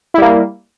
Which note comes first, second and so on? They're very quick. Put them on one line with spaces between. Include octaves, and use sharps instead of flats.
E4 G3 A#3